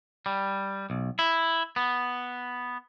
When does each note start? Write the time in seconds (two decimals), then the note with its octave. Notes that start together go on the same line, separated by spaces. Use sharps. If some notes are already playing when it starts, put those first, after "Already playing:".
0.26 G3
0.90 B1
1.19 E4
1.76 B3